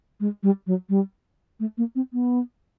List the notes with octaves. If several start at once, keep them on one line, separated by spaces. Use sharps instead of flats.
G#3
G3
F#3
G3
A3
A#3
C4
B3